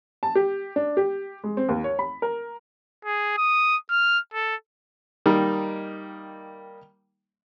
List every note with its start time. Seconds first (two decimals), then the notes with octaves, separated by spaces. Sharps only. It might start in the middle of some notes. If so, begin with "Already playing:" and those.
0.23 A5
0.35 G4
0.76 D4
0.97 G4
1.44 G#3
1.57 C4
1.69 D#2
1.84 C#5
1.99 B5
2.22 A#4
3.05 G#4
3.37 D#6
3.90 F6
4.33 A4
5.26 D#3 G3 A#3 D#4